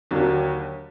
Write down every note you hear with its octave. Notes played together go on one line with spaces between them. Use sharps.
D#2 D3 F#3 A#3 D4